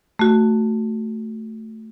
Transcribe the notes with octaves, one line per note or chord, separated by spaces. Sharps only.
A3 F#4